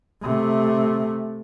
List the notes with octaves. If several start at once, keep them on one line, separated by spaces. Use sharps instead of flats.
C3 A3